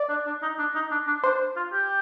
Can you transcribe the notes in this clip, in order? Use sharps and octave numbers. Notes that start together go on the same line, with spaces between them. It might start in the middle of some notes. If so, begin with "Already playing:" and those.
Already playing: D5
D4
D4
D#4
D4
D#4
D4
D4
D4 C5
F4
G4